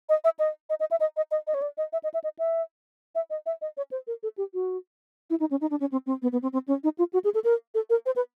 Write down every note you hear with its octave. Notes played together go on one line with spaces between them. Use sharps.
D#5
E5
D#5
D#5
D#5
E5
D#5
D#5
D#5
D#5
C#5
D5
D#5
E5
D#5
E5
D#5
E5
E5
D#5
E5
D#5
C#5
C5
A#4
A4
G4
F#4
E4
D#4
C#4
D#4
D4
C#4
C4
C4
B3
B3
C4
C4
C#4
D#4
F4
F#4
G#4
A4
A#4
A4
A#4
C5
B4